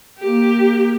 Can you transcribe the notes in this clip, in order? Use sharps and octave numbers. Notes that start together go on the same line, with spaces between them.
A#3 G4